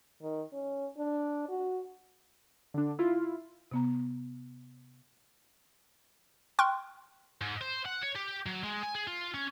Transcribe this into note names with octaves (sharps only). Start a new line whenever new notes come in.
D#3
C#4
D4
F#4
D3 D4
E4 F4
C3 B3 A#5
G5 C6 C#6 F6 F#6
G#2
C5
F#5
C#5
G4
F#3
G#3
G#5
G#4
F4
C#4